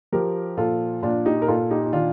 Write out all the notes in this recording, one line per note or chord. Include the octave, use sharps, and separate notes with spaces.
F3 G4 A#4
A#2 F4 A4
A#2 D4 F4
D#4 G4
A#4
A#2 F4 A4
D#4 G4
D#4
D#3 D4 F4